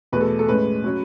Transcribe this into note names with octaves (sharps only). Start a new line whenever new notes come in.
E2 B2 A3 B4
A4
A4
A2 G#3 C#4 B4
F#3 C#4